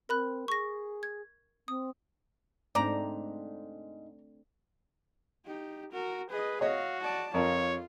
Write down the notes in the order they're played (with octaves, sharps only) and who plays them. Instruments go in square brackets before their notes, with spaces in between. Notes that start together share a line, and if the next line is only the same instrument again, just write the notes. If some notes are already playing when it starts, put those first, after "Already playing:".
[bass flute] C4 [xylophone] A#4 B5 F#6
[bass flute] G#4 [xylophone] C#6 A#6
[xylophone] G#6
[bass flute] C4 [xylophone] D#6
[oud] G#2 [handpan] A3 C4 D4 [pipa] D5 A#5
[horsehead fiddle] D#4 G4
F#4 A#4
[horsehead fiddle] G#4 D#5 [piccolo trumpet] B4
[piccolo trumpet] F#4 [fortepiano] C#5 D#5 [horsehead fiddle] F5
[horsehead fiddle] D5 A5
[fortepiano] F2 A#4 [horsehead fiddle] F4 [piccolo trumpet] C#5